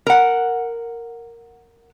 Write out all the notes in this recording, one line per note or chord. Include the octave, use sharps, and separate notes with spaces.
A#4 F#5